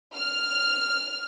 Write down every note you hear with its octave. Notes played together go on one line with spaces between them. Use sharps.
F6